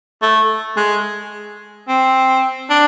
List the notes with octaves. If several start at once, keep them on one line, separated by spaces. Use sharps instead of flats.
A3
G#3
C4
D4